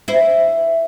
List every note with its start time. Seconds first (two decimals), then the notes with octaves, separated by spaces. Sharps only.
0.08 E4 C5